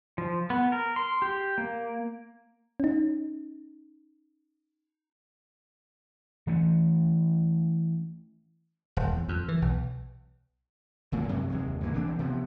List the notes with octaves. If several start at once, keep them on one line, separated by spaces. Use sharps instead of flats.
F3
B3
A#4
C6
G4
A#3
C#4 D#4
E3 A3 B3 C#4
D#1
E2
F2
E3
B1
D1 A#2 A3 A#3
F#2 C3 F#3
F#1 D#2 C3 G#3
G1 D3 E3 A#3
A#1 E3 C4 D4
C3 F3 B3